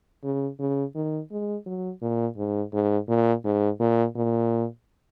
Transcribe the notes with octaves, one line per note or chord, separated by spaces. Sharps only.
C#3
C#3
D#3
G#3
F#3
A#2
G#2
G#2
A#2
G#2
A#2
A#2